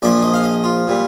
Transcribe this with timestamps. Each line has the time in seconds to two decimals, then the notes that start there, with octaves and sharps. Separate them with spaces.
0.02 A#1 A#2 F3 D5
0.22 D#5
0.34 F5
0.44 D#5
0.64 F4
0.87 A#2 G3